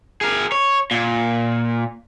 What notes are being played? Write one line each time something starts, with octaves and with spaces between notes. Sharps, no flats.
G#4 A#4
C#5
A#2